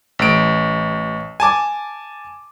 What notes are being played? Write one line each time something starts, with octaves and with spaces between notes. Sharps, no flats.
A1 D7
G#5 A5 D6